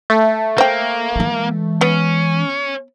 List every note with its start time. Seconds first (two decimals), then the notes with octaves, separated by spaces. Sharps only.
0.10 A3
0.58 A#3 C5 G5
1.16 E3 G#3
1.81 B3 C#4